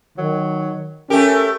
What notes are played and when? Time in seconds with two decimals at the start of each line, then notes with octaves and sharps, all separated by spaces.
0.18 D#3 F#3
1.10 A3 C#4 G4 A#4